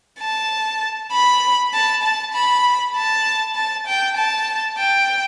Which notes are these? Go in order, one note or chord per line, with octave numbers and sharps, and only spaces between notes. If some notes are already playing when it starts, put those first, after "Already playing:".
A5
B5
A5
A5
B5
A5
A5
G5
A5
G5